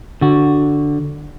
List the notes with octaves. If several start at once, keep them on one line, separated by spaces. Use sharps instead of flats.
D3 F#4